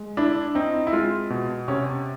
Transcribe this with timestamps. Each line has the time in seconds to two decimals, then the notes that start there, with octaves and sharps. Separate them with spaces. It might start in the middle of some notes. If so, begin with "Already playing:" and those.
Already playing: G#3
0.17 D4 E4
0.55 C4 D#4
0.87 E4
0.93 G#3 F4
1.30 B2
1.68 C3 C#4